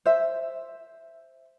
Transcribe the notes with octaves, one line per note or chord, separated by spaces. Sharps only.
C5 E5